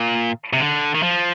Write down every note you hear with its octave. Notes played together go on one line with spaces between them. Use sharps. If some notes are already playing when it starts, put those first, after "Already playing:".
Already playing: A#2
C3
D3
D#3
F3